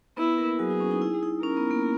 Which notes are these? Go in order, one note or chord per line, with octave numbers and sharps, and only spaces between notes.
B3 E4 B4
A#3 A#4
F#3 F#4 G#4
E4
C#4
D#4
E4
D#4
C#4 A#4
B3
A#3